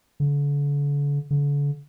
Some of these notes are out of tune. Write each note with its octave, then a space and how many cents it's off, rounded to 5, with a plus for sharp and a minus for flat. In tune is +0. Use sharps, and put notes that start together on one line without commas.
D3 -40
D3 -40